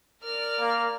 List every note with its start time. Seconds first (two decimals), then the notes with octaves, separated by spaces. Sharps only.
0.22 A#4 D5 F6
0.60 A#3